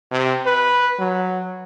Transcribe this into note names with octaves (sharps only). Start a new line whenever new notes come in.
C3
B4
F#3